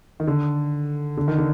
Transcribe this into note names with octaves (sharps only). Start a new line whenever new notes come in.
D#3
D3
D3
D#3
D3